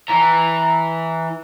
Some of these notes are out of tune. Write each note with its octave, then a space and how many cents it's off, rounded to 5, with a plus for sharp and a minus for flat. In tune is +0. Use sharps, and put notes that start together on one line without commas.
E3 -10 A#5 +0